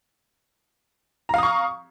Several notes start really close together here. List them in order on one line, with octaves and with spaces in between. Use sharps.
A#5 F5 D#6 C#6